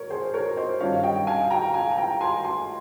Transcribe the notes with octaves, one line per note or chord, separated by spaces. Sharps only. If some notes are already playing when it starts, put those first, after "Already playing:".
Already playing: A#4 C#5
G#4 C5
A#4 C#5
C5 D#5
G2 D#3 G3 C#4 F4 C#5 F5
D#5 G5
F5 G#5
G5 A#5
F5 G#5
G#5
G5 A#5
G#5 C6
G#5 C6